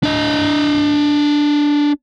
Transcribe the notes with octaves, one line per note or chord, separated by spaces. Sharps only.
D4 D#5